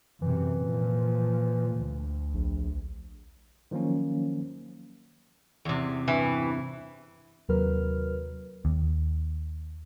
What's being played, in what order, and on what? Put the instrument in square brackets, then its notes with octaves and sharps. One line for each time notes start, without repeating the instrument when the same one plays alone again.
[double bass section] F#2 C3 [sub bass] E3
[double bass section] A#2 F3
D2
[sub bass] A#1
[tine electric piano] D#3 F3 F#3 A#3 C#4
[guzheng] E2 C3
[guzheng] G2 [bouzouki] E3
[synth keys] D#2 C3 F#3 A#4 B4 F6
[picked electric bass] D#2